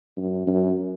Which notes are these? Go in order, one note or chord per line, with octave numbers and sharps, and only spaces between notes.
F#2
F#2